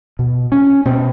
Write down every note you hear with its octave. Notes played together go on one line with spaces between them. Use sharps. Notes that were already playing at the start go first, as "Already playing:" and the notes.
B2
C#4
B2 C4